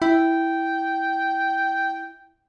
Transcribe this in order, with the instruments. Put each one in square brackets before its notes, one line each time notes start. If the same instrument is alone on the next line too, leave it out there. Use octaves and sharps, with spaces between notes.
[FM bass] E4 [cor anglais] G5